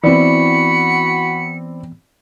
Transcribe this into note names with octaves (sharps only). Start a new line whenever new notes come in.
E3 B3 C4 E4 F#4 D5 B5 C#7